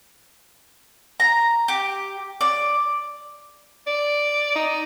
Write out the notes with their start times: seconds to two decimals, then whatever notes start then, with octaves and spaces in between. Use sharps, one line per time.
1.20 A#5
1.68 G4
2.41 D5
3.87 D5
4.55 D#4